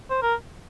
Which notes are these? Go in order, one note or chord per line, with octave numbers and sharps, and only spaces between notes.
C5
A#4